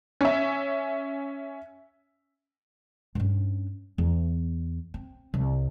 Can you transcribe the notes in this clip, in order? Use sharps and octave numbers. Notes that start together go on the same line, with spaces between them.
C#4 E5
G2 C#4
E2
C4
C2